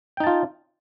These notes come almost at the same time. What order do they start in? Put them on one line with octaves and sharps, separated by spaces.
G5 D#4 A5 F4